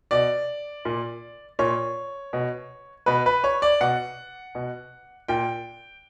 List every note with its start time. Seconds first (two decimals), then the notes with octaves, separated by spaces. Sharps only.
0.11 B2 D5
0.85 A#2
1.59 A#2 C#5
2.33 B2
3.06 B2 B4
3.26 B4
3.44 C#5
3.62 D5
3.81 B2 F#5
4.55 B2
5.28 A#2 G5